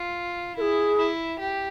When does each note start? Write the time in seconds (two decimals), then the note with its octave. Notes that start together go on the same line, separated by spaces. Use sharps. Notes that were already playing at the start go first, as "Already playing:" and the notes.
Already playing: F4
0.56 E4 A#4
0.61 G#4
0.98 E4
1.39 G4